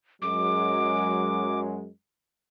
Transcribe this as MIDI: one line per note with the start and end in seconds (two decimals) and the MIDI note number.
0.22 1.90 42
0.22 1.90 54
0.22 1.90 56
0.22 1.60 86